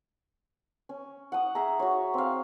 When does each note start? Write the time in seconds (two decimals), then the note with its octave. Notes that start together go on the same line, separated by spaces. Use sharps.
0.89 C#4
1.32 F#5 D#6
1.55 G#4 E5 A#5
1.79 F#4 C#5
2.14 C4 F5